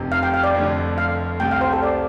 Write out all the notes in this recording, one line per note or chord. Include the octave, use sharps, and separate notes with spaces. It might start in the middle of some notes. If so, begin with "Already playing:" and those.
Already playing: F1 F2 C3
F5
G5
F5
D5
F2 D3 A3
F5
C2 C3 A3 G5
F5
C5
A4
D5